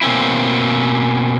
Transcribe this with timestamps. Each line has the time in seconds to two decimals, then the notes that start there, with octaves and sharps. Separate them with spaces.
0.01 B2 A#3 C4 C#4 E4